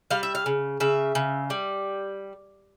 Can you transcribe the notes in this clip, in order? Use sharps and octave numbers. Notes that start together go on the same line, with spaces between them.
G3 F5
E5
F5
C#3
C#3 E5
C#3
G3